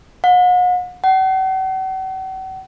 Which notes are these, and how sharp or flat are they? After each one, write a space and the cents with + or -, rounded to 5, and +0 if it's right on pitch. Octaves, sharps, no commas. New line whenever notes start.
F#5 -40
F#5 +45